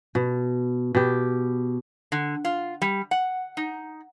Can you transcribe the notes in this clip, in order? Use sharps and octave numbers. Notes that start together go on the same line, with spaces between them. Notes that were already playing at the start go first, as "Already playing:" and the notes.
B2
B2 G4
D3
F4
G3
F#5
D#4